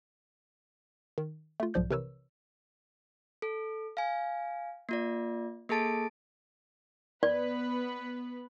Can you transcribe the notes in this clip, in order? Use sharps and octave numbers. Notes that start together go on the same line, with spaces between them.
D#3
A3 F4
B1 G#2 F3 D5 G6
C3 E3 A#4 B4 C#5 E6
A4
F5 G#5
A#3 F4 D5
A#3 G#4 A4 A5 A6 D7
B3 B4 D5